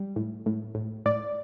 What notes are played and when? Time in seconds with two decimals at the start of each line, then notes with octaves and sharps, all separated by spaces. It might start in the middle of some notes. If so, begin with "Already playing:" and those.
Already playing: G3
0.16 A2
0.46 A2
0.75 A2
1.06 A2 D5